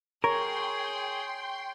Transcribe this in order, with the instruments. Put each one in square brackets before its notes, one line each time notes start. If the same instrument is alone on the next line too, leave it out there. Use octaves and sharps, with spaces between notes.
[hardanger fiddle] G#4 [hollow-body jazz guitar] A#4 [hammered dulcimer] C#5 [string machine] G5 C6